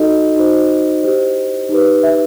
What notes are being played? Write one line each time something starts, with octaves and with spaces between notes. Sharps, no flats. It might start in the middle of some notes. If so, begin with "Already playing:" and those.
Already playing: D#4 F#4 A4 D#5
D#4 F#4 C5
E4 G4 C5
D#4 G4 B4
E5